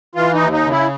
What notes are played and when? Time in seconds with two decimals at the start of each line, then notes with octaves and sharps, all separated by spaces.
0.15 E3 F4
0.34 D#4
0.40 D#2
0.52 D#4
0.64 C#3
0.71 E4